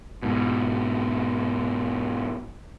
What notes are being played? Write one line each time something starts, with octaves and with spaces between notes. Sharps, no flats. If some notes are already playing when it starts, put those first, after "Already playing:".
G#2 B2